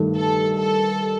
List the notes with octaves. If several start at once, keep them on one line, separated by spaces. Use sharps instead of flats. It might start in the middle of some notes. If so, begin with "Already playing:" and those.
Already playing: G2 D#3 A3
A4
A4